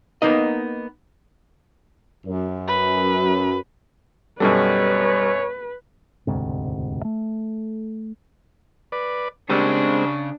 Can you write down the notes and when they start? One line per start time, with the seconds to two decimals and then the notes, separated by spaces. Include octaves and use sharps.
0.22 A#3 B3 D#4 D#5
2.25 F#2
2.68 B4
4.40 F#2 B2 G3 A4 B4 C#5
6.27 E1 D2 G#2 C3
7.05 A3
8.92 B4 D5
9.49 A#1 C#3 G3 G#3 C4 D4 E6